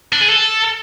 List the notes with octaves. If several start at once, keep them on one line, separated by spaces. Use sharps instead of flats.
D4
G#4
A4